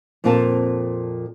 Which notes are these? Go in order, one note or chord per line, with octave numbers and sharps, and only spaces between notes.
F2 A#2 C4 F4 A#4 A5